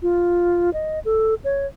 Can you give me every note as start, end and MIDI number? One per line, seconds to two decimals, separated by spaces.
0.03 0.70 65
0.73 0.99 75
1.05 1.34 69
1.44 1.66 73